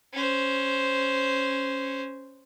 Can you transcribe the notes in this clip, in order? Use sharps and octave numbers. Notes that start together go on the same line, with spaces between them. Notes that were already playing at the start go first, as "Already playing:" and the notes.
C#4 C5